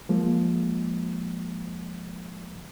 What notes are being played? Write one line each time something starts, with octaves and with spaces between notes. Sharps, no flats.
F3 G#3 A#3